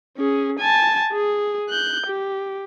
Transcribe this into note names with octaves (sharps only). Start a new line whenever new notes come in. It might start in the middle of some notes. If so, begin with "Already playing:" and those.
C#4 G#4
G#5 A5
G#4
F#6 G6
G4